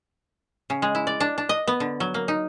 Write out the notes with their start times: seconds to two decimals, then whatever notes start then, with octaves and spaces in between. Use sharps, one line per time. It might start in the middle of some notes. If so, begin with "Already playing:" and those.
0.70 C#3
0.82 G#3
0.95 E4
1.07 D5
1.20 D4
1.38 D4
1.49 D#5
1.68 B3
1.80 D3
2.00 F#3
2.14 A#3
2.28 D#4